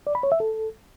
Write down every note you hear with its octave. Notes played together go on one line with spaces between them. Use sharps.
D5
B5
C#5
E5
A4